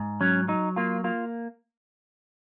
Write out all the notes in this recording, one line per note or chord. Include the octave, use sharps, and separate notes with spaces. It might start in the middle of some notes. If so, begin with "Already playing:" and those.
Already playing: G#2
F#3 C#4
F#3 D#4
A#3 F4
A#3 F4